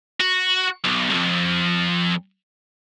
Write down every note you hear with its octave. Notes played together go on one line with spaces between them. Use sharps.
F#4
B1
C2 F2